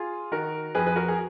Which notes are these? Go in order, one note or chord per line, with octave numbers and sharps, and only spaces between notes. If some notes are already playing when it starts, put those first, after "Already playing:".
Already playing: F4 G#4
D#3 F#4 A#4
F2 G#4 B4
B4
F#4 A#4
G#4